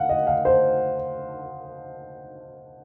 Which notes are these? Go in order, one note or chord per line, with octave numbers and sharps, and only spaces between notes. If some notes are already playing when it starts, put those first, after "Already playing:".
Already playing: F5 F#5
D#5
F5
C5